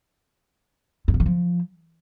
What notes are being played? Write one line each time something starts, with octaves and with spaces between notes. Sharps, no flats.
G2
A2
D#3
F3